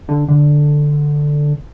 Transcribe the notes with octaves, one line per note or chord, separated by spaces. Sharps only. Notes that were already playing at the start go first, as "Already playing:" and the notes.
D3
D3